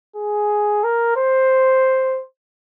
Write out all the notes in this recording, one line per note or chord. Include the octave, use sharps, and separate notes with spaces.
G#4
A#4
C5